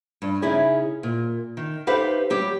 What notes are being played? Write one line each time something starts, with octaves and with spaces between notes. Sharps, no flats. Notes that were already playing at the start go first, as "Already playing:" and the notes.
G2
C#3 C#4 D#4 E4 G#4
A#2
D#3
D#4 G4 A4 B4 C5 F5
F#3 G3 G4